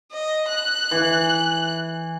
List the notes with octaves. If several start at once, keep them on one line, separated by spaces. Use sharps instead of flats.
D#5
F#6
E3